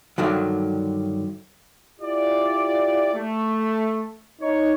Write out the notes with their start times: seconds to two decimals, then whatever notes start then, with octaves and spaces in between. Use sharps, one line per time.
0.18 G2 D3 D#3 F#3
2.00 E4 F4 G4 D5
3.14 A3
4.41 D#4 C#5